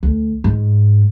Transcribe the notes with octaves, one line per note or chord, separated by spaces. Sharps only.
D2
G#2